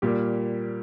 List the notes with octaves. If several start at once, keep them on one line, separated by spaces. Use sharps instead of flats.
A#2 G3 A#3 G4